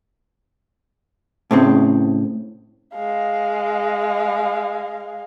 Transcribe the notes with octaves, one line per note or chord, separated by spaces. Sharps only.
A2 C#3 C4
G#3 F5